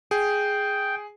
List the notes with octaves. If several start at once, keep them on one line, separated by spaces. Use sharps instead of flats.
G#4 G5